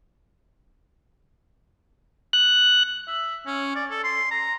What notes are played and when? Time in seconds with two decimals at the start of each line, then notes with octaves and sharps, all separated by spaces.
2.33 F#6
3.08 E5
3.47 C#4
3.75 D5
3.91 A4
4.04 C6
4.31 A#5